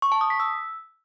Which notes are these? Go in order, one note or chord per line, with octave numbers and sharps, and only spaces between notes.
C#6
A5
D#6
B6
E6